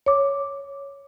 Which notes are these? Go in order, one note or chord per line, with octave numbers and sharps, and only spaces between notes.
C#5 D6